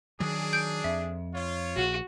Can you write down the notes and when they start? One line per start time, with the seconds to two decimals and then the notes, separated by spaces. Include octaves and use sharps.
0.20 D#3 F#3 D4 G#4
0.53 G6 D7
0.84 F2 E5
1.35 F4 C#5
1.77 A#1 F#4